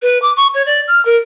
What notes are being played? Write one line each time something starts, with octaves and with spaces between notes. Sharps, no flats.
B4
D6
C#6
C#5
D5
F6
A#4